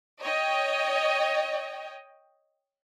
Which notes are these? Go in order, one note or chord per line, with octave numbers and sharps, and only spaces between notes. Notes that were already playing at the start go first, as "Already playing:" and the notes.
C#5 D#5 G5